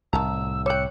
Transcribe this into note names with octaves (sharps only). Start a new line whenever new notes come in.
C2 A2 D#3 A5 A#5 E6
G3 C#5 G5 E6 F#6 C#7